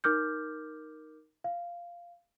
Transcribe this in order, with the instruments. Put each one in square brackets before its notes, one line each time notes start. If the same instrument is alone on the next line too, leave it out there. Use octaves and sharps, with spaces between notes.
[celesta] D#4 A#4 D6 F6 G6
F5